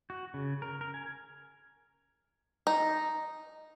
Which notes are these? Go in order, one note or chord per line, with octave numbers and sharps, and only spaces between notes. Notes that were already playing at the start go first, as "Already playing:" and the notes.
F#4
C#3
A#4
A#4
G#5
D#4